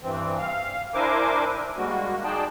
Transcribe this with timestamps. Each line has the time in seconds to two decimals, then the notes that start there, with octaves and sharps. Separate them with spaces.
0.01 G2 E3 C4
0.39 F5
0.94 D4 E4 A#4 C5 G#5 D6
1.77 G3 G#3 A#3 F#4
2.24 G#3 D#4 G#4 D5 G5 A5